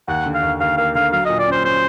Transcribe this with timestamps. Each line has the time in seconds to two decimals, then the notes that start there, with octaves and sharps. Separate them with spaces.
0.08 D#2 F#5
0.26 D3
0.34 F5
0.42 D#2
0.60 D#2 F5
0.77 A#3 F5
0.95 D3 F5
1.12 F#3 F5
1.26 A#2 D#5
1.39 D5
1.47 C#4 C5
1.64 C#4 C5